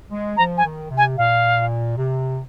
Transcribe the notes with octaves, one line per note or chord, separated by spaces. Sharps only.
G#3
F3 A#5
G#5
D#3
C3
G#5
A#2 F5
C3